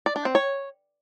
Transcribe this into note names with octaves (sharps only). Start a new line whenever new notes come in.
D5
D4
C4
C#5